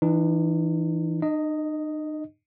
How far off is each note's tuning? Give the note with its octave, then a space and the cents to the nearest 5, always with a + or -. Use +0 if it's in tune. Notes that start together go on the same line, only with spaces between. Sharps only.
E3 +0 D#4 -45
D#4 -40 D#5 +0